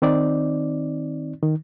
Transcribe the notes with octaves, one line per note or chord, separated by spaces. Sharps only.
D#3 C4 D#4 D5
D#3